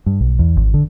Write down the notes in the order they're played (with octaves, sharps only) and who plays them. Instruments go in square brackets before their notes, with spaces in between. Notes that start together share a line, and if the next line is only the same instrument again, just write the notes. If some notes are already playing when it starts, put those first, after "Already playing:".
[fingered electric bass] G2
B1
E2
G#1
D3